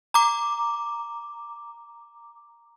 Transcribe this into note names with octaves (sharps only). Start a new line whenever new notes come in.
A#5 D6